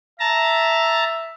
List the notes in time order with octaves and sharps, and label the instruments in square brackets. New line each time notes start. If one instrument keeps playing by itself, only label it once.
[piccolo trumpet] E5 [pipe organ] A5 A#5